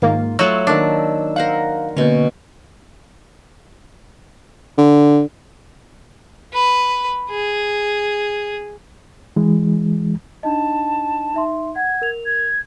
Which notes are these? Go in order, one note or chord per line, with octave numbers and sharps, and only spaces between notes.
G#2 D#3 A#3 F4
F#3 A3 F4 F#4 E6
D#3 A#3 D4
A#4 C5 F5 F#5
B2 D3 A#3 C#4
D3
B4
G#4
E3 G#3
D4 D#4 D#5 A5
D#4 E5 C6
F#5 G#6
A#4 F7
G#6